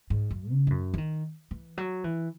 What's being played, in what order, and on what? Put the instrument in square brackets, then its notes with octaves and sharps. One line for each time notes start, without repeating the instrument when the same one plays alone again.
[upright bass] G#2
F#2
C#3
G#2
F#2
E3
D#3
E3
F#3
E3